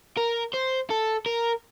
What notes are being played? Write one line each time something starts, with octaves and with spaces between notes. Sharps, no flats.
A#4
C5
A4
A#4